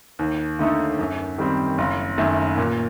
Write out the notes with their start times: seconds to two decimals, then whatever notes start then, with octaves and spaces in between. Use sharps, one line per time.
0.19 D#2
0.59 D3 A3 D#4 A4
0.98 F#2
1.38 D#3 G3 C4
1.78 F#1
2.18 F#2 D#3 A3
2.58 A#2